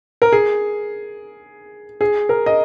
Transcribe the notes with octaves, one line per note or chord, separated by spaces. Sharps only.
A#4
G#4
G#4
A#4
D#5